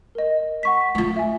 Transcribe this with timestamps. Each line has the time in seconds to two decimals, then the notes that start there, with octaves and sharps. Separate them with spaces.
0.15 A#4 D#5
0.63 F#5 C#6 B6
0.95 A3 F4
1.16 E5 G#5